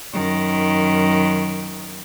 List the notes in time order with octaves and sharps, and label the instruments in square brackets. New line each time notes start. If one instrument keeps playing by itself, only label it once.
[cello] F#2 D#3